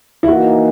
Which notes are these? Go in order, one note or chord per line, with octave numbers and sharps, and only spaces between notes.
E4
E3 A#3 D#4 F#4